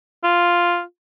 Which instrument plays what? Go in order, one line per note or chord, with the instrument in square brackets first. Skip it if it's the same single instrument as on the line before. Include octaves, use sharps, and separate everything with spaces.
[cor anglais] F4